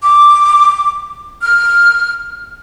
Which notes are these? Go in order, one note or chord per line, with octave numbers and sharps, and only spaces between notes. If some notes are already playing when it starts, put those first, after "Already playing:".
D6
F6